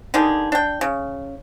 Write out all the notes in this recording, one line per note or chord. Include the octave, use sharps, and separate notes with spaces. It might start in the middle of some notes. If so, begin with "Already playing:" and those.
D3 D#3 G4 G#4
D4 G5
C#3